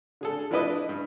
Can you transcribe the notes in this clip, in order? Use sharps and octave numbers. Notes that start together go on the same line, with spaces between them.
D3 G#4 A4
F3 D4 E4 B4 D#5
G2